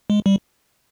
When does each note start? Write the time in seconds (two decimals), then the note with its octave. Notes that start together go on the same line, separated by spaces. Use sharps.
0.10 G#3
0.26 G3